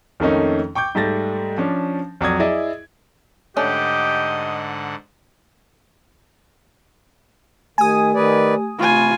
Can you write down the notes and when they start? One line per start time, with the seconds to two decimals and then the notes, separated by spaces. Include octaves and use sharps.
0.20 F2 D#3 A3 A#3 C#4 D#4
0.75 G5 C#6 D6 G6
0.95 G#2 G3 A3 A6 A#6
1.58 F3 C#4 D4
2.21 F2 F#3 D5 D#6 G#6
2.40 E4 G#4 D5 D#5
3.57 G#2 D3 A3 C#4 D4 G4 D#5 F#5
7.78 D#3 A3 G4 G#5 D#6
8.14 D#3 B4 D5
8.79 C3 A3 F4 G#5 B5 C#6